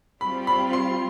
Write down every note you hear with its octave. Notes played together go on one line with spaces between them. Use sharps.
G3 C4 F4 B5
B5
C6